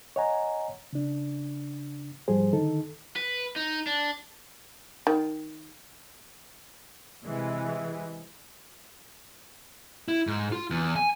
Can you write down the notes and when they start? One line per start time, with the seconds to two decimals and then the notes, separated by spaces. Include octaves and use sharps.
0.16 C#5 D#5 F#5 G#5 A#5
0.93 C#3 D4
2.28 G#2 F3 G3 G#4 C5
2.53 D3 D#3 D#4 A4
3.16 B4
3.56 D#4
3.87 D4
5.07 D#3
7.23 C3 E3 G#3
10.08 E4
10.27 G#2
10.52 F4
10.70 E2
10.96 G#5